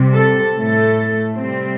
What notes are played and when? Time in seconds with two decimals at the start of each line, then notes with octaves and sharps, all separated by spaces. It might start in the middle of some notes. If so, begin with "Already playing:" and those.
Already playing: C3 G3
0.14 A4
0.56 A2 A3 A4
1.37 C3 G3 C4